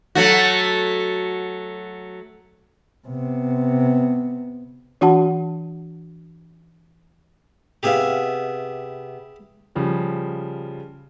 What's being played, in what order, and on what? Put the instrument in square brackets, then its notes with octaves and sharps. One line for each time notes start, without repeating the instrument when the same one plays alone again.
[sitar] F#3 A3 F#4
[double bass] C3 B3
[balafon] E3 D4 F#4 F#5 A5
[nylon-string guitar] C3 B3 F5 [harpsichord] G4 G#4 E5
[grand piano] C#3 F3 G3